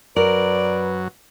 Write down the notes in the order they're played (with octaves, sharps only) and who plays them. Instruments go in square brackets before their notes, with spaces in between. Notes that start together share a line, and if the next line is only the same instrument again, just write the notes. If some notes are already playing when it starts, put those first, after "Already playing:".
[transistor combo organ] F#2 F#3 [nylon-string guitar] A#4 [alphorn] B4 [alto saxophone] D5